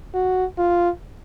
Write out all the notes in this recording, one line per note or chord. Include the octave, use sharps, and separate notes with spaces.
F#4
F4